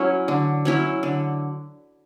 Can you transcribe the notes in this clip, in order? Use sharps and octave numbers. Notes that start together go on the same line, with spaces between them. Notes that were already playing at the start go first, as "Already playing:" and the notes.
Already playing: F#3 C#4 E4
D3
F#3 C#4 E4
D3